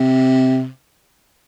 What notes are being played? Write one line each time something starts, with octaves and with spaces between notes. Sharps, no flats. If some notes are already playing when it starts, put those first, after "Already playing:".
Already playing: C3